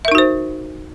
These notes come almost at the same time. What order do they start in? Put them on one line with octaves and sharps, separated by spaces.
E5 A#4 D#4 F#4 C5